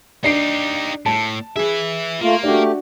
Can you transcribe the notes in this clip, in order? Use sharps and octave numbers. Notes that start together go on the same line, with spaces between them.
D4 D#4 G4 C7 D7
A2 A5
G#4 B4 E5
A3 A#3 F4
A3 D4 F#4 G4